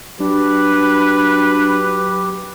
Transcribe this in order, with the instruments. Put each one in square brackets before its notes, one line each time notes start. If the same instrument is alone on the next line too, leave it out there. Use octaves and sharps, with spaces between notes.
[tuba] F#3 [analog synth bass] D4 [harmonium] G4 [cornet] B4